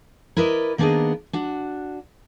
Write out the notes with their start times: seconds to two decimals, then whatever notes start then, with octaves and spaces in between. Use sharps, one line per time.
0.37 E4 A#4 B4 D5 D#5
0.78 D#3 A#3 B3 D4 G#4 D#5
1.33 D4 F#4